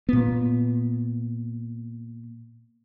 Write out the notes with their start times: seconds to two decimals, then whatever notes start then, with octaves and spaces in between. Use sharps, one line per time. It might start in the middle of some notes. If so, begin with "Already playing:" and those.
0.09 A#2 B3